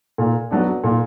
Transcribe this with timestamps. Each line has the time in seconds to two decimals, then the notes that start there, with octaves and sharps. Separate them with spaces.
0.18 A#2
0.51 F#3 B3 D4
0.84 A#2